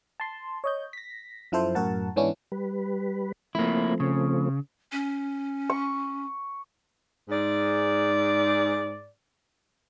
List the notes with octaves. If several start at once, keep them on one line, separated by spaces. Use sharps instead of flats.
A5 C6
C#5 D#5 G6
A#6 B6
F#2 F3 E4 A4 C5
F#2 A2 F#4 A#4 F#5 A5
G#2 E3 B3 C#4 D4 E4
G3 B4
F3 A3 A#3 C4 E4
C#3
C#4
C#6
G#2 D5